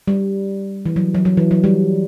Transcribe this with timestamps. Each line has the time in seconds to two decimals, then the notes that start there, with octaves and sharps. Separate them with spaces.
0.08 G3
0.86 E3
0.96 F#3
1.14 F#3
1.25 F#3
1.37 E3
1.51 F#3
1.64 G3